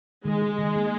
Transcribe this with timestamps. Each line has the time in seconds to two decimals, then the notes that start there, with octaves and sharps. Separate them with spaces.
0.25 D#3 G#3
0.42 G#4
0.59 D#3
0.76 A#3